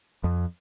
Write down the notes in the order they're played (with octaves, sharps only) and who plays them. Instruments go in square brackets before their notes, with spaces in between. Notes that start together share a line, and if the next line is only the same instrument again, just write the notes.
[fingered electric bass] F2